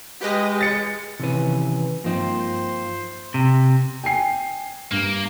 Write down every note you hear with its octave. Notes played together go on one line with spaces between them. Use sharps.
G#3 G4 B4 D#5
A6 C#7
C3 D#3 E3 C#4 B4
G2 F3 A#3 C4 D#4 C5
C3
G5 G#5 C7
G2 A#3